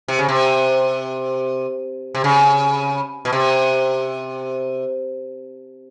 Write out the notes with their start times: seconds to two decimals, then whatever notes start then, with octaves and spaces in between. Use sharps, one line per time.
0.08 C3
0.19 C#3
0.29 C3
2.15 C3
2.24 C#3
3.25 B2
3.33 C3